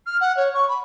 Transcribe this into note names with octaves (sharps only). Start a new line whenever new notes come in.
F6
F#5
C#5
C#6
B5